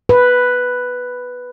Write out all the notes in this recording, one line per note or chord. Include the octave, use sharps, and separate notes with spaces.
B4